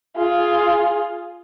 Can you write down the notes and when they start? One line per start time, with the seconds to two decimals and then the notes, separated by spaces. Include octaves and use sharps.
0.17 F4 G#4